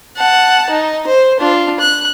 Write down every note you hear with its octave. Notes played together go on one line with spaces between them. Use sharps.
F#5 A5
D#4
C5
D4 F4
F#6